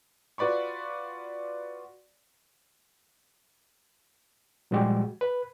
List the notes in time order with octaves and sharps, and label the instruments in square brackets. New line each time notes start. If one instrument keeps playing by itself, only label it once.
[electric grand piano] F4 F#4 B4 D5 B5 C#6
[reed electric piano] A#2 F3 G3 G#3 F#4 G4
B4